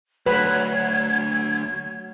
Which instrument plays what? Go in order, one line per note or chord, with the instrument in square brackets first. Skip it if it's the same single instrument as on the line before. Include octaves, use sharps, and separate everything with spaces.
[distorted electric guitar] D2 [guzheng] F#3 [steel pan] B4 [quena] G#6